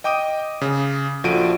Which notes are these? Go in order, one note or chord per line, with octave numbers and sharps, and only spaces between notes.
D#5 G5 D6 D#6 D#7
C#3
A#1 F3 F#4 A4 D7 D#7